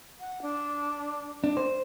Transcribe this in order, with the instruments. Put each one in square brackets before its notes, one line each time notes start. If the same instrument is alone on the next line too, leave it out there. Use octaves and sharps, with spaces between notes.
[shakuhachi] F#5
D4
[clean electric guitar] D4
C5